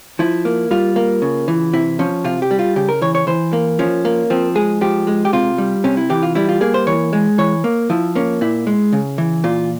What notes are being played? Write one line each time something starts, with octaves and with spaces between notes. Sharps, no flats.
F3 E4
A#3
G3 F4
A#3
C#3
E3
C3 E4
F3 C#4
C3 F4
G4
G3
F4
C#3 G4
A#4
E3 C#5
C#5
E3 C5
A#3
F3 C#4
A#3
F3 C4
G#3 G#4
F3 G4
G#3
G4
C3 F4
G3
C3 C#4
E4
E3 G4
F4
G3 E4
F4
A#3 G#4
C5
E3 C#5
G#3
E3 C#5
A#3
F3 E4
A#3 C#4
A#2 E4
G#3
C#3
E3
A#2 F4